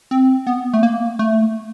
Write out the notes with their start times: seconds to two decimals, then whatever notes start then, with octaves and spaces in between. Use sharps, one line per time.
0.11 C4
0.47 B3
0.73 A3
0.83 A#3
1.19 A3